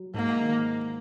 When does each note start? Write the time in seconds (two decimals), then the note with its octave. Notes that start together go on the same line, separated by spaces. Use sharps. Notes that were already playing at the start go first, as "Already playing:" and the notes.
Already playing: F#3
0.14 G#2 A#3
0.41 D#3